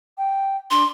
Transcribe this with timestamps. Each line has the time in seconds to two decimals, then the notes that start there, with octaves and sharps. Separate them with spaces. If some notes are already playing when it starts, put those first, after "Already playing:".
0.18 G5
0.71 D4 C6